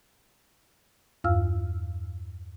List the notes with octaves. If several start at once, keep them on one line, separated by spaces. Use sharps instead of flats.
E2 G2 F4 F5 E6 F6